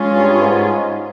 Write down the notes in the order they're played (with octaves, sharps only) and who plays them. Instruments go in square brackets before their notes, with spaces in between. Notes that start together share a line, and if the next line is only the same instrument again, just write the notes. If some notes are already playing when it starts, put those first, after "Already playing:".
Already playing: [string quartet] G#3 C#4 F4 G#4
[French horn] G2
G#2